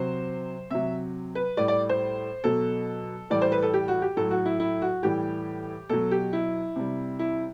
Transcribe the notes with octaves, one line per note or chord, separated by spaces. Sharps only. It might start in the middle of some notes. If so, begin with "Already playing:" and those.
Already playing: C3 F#3 C5
C3 F#3 E5
B4
A2 G3 D5
D5
C5
B2 F#3 A4
A2 E3 G3 D5
C5
B4
A4
G4
F#4
G4
A2 F#3 A4
F#4
E4
E4
F#4
A2 E3 G3 G4
B2 F#3 A4
G4
E4
C3 G3
E4